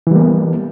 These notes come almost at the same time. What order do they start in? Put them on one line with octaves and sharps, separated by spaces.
E3 G3 A#3 B3